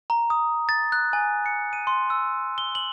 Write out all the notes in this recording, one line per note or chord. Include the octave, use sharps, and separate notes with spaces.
A#5
D#6
A6
F#6
G#5
C#7
D#7
C6
E6
G7
F#7